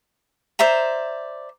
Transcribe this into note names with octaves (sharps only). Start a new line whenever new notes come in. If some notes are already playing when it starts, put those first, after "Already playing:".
C5 D5 E5 A#5